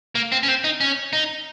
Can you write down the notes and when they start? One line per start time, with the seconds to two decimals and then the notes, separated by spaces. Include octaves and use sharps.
0.15 A#3
0.32 C4
0.43 C#4
0.48 C4
0.64 D#4
0.81 C#4
1.13 D#4